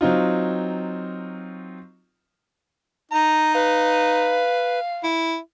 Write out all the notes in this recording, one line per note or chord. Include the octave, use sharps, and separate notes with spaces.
F#3 C4 D#4 F4
D#4 A#5
B4 F5
E4